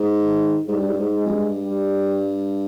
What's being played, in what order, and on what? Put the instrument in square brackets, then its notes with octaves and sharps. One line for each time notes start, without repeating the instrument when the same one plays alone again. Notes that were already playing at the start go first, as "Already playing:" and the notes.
Already playing: [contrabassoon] G#2
[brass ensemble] D#3
[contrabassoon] G#2 [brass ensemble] G3
[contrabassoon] G2
G#2
G2
G#2
[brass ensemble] G#3
[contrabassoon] F2
G2
[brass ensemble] G3